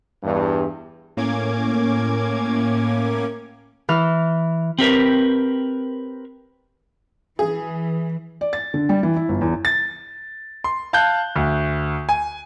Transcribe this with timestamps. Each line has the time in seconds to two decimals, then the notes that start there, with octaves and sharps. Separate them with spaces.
0.23 E2 G2
1.17 A2 A#3 C#4 D6 G#6
3.89 E3 F6
4.79 C4 G4 A#4 B4
7.39 E3 G#4
8.41 D5
8.53 A6
8.74 D3
8.89 G3
9.03 E3
9.16 E4
9.29 G1
9.41 E2
9.65 A6
10.64 C6
10.93 F5 A5 F#6 G6
11.36 D2
12.09 G#5